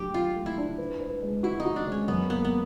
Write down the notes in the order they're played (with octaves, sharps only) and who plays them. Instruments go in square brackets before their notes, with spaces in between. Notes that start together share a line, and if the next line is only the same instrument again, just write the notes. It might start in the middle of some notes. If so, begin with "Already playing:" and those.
Already playing: [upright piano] F#3 A3 D4 [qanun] G4
[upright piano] F#3 [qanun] F4
[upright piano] A3
[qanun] E4
[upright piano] D4
B4
B4
G#3
[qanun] E4 [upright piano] F#4
[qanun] D#4
[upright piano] F#4
[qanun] D4
[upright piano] G#3 [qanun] C#4
[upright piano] F#2 [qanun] B3
[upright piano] A#3 [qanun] B3
[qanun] B3